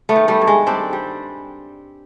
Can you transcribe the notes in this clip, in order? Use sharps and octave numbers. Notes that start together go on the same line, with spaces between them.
A3 B3
D#3
G3 A3
G2
G#3
G3 C4 D4
G3